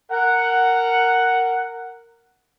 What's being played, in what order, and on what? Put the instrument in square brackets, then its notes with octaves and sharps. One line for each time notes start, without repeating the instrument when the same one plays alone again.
[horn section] A#4 F#5